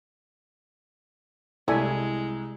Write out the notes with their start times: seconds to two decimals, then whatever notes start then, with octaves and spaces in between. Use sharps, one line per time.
1.68 C2 G#3 A3 D4 E4 E5 G#5